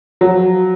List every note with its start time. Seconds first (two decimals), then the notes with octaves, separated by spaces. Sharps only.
0.21 F3 F#3